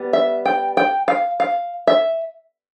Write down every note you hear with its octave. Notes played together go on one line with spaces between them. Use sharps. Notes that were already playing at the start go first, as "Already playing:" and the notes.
Already playing: G3 B3
E5
G5
G5
F5
F5
E5